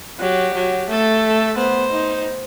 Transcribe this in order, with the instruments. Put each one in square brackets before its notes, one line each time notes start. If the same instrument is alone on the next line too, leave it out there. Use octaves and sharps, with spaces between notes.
[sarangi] F#3 [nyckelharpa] G4
[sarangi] F#3
[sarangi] A3 [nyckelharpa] A4
[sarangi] B3 [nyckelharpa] C5
[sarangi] D#4